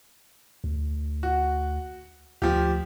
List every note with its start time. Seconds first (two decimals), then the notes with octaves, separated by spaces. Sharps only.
0.64 D2
1.23 F#4
2.42 D2 F3 G4